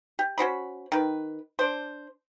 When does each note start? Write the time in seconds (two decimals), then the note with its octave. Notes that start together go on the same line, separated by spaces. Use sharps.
0.19 G4
0.38 C#4 F#4 C5 B5
0.92 D#3 B4
1.59 D4 C5